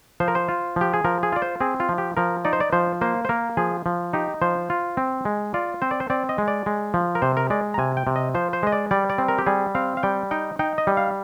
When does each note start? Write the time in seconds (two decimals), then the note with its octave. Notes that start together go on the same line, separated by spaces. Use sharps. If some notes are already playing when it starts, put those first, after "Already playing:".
0.20 F3 C5
0.28 A#4
0.35 C5
0.48 F4
0.76 F3 G4
0.93 G#4
1.04 F3 A#4
1.23 G#4
1.32 F4 D5
1.42 C5
1.61 C4 G#4
1.80 F4
1.89 F3
1.98 G4
2.17 F3 A#4
2.45 D#4 D5
2.53 C5
2.60 D5
2.72 F3 C5
3.01 A#3 C5
3.25 C5
3.29 A#3 A#4
3.57 F3 G#4
3.86 F3
4.13 D#4 G4
4.42 F3 C5
4.70 F4
4.97 C4
5.25 G#3
5.54 F4 D5
5.82 C4 C5
5.91 D5
6.00 C5
6.10 C4 D5
6.29 D#5
6.38 G#3
6.48 D5
6.66 G#3
6.94 F3
7.15 A#4
7.22 C3 C5
7.37 A#4
7.50 G#3 D5
7.74 A#5
7.78 C3 G#5
7.97 G5
8.07 C3
8.16 D#5
8.35 F3 C5
8.53 C5
8.63 G#3 D#5
8.72 D5
8.91 G3 D5
9.10 D5
9.18 C4
9.28 A#4
9.38 G4
9.46 G3 G#4
9.75 C4 F5
9.97 F5
10.03 G3 G5
10.31 D#4 G5
10.59 D#4 G5
10.78 D#5
10.87 G3
10.97 F5